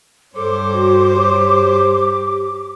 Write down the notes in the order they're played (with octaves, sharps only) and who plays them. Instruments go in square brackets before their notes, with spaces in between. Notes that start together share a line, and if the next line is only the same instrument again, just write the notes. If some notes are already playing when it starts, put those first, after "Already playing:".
[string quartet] G2 C5 C#5 [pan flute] A4 [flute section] D6
[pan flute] F#4
G4